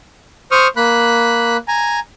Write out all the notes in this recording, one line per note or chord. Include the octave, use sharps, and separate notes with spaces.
C5 C#6 D#6 F6
A#3 B5 F#6
G#5 A#5